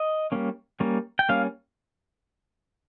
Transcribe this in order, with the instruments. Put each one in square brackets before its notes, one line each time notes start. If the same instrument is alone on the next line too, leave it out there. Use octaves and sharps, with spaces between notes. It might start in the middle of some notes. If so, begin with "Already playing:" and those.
Already playing: [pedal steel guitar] D#5
G3 A#3 C#4
G3 A#3 C#4
G5
G3 A#3 C#4 F5